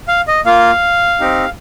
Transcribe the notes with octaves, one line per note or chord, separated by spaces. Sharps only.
F5
D#5
A#3 F4 F5
C4 D#4 G4